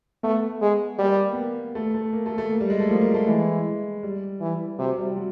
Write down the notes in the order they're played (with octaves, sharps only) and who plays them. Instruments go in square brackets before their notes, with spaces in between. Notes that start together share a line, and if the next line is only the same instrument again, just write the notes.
[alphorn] A3 [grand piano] B3
[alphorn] G#3
[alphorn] G3 [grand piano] A#3
[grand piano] B3
A#3
A3
A3
A#3
A3
A3
A#3
G3
G#3
A3
[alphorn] F3 [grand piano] A#3
[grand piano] A#3
A3
[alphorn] E3 [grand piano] G#3
[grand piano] G3
[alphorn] E3
[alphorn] C3 [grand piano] F#3
[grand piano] G3
F#3